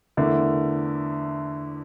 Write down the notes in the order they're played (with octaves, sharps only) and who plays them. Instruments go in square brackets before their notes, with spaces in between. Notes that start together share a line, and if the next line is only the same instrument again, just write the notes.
[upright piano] E2 D3 A3 E4 A#4